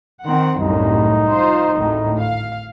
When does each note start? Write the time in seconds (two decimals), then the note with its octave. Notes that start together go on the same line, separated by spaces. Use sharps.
0.23 D#3 C4 F#5
0.59 C2 F#2 A2 D#4
1.30 F4 C5
1.75 G#1 D2 A2
2.21 F5